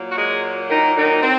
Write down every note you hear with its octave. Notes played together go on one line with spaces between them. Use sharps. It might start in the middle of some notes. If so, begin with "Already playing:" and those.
Already playing: A#2 F#3 A#3
F#4
G#3 G#4
D#3 D#4
D#3 D#4
C4